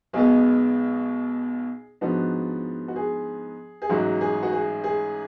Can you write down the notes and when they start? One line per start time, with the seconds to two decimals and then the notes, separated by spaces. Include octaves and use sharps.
0.13 B1 B2 G#3 B3 G#4
2.01 G#2 F3 B3 D4 F#4
2.88 F#4
2.96 G#4
3.82 G#4
3.90 A1 G#2 F#3 F#4
4.21 G#4
4.43 F#4
4.52 G#4
4.84 G#4